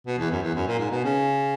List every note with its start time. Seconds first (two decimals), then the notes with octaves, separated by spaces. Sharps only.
0.07 B2
0.19 E2
0.31 F#2
0.43 E2
0.55 F#2
0.67 A#2
0.79 G#2
0.91 B2
1.04 C#3